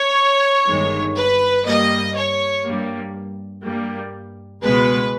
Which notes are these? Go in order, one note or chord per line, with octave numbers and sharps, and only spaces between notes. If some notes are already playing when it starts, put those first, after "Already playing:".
Already playing: C#5
G1 G2 D#3 G#3
B4
G2 G3 A#3 D#5
C#5
G2 G3 A#3
G2 G3 A#3
C#2 B2 G#3 B3 B4